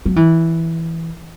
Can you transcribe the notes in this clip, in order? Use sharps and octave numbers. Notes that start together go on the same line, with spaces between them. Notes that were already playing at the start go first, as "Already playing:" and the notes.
F#3
E3